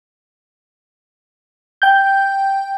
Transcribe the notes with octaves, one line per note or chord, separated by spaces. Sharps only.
G5 G6